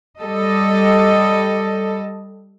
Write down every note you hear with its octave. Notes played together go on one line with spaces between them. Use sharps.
G3 A4 D#5